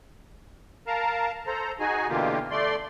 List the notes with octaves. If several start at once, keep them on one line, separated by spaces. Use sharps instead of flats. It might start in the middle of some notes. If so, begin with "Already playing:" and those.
A#4 F5 A5 A#5
A4 C5 A#5
D#4 F#4 G#4 G#5
B2 D3 E3 A#3 F4 G4
A3 D5 C6